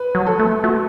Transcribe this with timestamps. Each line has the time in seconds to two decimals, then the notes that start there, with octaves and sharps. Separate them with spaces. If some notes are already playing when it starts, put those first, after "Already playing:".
Already playing: B4
0.15 F#3
0.27 A4
0.39 A3
0.64 A3 F#4